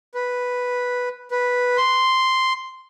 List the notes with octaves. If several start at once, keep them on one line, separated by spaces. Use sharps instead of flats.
B4
B4
C6